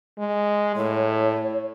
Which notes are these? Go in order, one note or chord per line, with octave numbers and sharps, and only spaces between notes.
G#3
A2 C#5